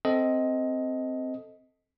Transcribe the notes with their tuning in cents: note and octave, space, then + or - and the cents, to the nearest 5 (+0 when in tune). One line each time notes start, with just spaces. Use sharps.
C4 +0 A4 +0 D#5 +15